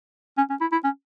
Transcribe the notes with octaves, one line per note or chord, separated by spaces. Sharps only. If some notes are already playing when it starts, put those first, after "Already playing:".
C#4
C#4
E4
E4
C#4